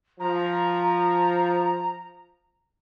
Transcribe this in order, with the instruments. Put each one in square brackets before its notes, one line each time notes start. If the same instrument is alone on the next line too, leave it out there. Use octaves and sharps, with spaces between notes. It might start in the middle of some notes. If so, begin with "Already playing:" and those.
[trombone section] F3 [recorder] A#5